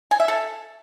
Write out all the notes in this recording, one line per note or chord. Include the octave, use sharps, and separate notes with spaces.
G#5
E5
A4